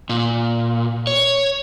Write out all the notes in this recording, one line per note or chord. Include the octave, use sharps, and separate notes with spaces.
A#2
C#5